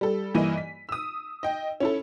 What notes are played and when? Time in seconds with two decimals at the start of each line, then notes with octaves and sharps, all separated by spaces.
0.01 G3 A4
0.35 G2 E3 A#3 E4 D#5 D#7
0.57 B6
0.89 D#6 E6
1.43 D#5 G5
1.80 C#4 E4 A4